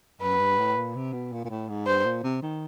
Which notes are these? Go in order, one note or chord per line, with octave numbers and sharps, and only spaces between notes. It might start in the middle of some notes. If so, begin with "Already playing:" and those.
F#2 B4
G2
A2
A#2
C3
B2
A#2
A#2
A2
G#2
G2 C5
A#2
C3
D#3